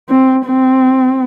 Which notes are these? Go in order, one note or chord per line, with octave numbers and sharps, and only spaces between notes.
C4
C4